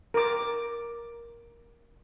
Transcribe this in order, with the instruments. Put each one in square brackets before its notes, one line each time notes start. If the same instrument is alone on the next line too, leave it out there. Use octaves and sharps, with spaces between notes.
[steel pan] A#4 D6